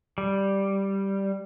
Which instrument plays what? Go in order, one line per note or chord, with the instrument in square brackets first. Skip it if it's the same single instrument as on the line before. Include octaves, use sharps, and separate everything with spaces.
[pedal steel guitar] G3